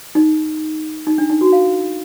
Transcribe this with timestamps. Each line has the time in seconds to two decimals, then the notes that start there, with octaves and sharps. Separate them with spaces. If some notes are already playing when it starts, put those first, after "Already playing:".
0.15 D#4
1.07 D#4
1.18 D4
1.30 D#4
1.41 F#4
1.52 F5